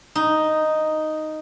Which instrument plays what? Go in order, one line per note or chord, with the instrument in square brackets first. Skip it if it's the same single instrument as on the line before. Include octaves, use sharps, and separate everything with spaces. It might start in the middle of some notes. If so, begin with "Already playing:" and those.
[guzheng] D#4